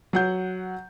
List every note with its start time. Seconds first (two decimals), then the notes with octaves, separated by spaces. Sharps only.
0.13 F#3 F#5 G6